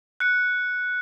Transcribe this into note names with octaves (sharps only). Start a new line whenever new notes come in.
F#6 C#7